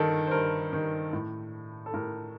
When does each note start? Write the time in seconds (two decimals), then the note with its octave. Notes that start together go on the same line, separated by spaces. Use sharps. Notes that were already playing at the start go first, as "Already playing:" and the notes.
Already playing: G2 D#3 A4 A#4
0.27 C5
0.31 G2 A#4
0.73 D#3
1.13 A2
1.86 A4
1.94 A2 A#4